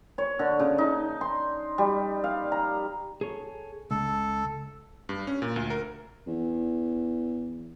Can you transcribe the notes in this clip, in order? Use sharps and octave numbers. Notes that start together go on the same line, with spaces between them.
C#5
D3
C#3
D#4
C6
G3
F5
A#5
G#4 A4 C#5
C#2 A4
G2
C#4
A#2
D2
A#4
E2